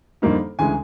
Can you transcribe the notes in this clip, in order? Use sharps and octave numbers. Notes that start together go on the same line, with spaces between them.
F2 D3 G3 A#3 D#4
D2 C#3 E3 G#3 G#5